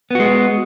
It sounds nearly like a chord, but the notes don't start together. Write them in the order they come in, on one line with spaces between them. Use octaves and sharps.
B3 F#4 G#3